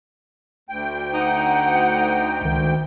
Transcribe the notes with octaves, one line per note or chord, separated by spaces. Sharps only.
D2 G5
D#4 F#5
C#2 D#3